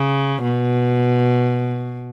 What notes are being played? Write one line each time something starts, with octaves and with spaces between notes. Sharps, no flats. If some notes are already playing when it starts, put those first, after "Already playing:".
Already playing: C#3
B2